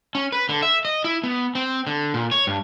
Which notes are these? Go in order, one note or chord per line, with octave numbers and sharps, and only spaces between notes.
C#4
B4
D3
E5
D#5
E4
B3
C4
D3
A#2
C#5
G2